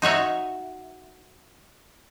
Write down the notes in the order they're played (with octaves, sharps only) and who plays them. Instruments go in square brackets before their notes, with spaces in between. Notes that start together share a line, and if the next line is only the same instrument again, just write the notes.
[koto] D#4 F#4 C#5 E5